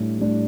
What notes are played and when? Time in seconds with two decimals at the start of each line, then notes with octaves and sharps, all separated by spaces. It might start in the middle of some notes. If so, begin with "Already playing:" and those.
Already playing: A2 G3 D4
0.18 A2 G3 D4